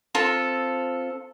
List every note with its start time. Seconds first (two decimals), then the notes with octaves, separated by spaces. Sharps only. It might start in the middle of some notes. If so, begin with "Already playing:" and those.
0.15 C4 F4 A4